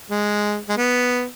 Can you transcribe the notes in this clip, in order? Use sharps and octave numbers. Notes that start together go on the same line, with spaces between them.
G#3
G#3
B3